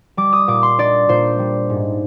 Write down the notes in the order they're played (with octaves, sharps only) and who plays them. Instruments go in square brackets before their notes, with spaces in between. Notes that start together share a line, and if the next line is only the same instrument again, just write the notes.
[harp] G3 D6
D#6
A#2 D6
C6
D4 D5
A#2 C5
G3
G#2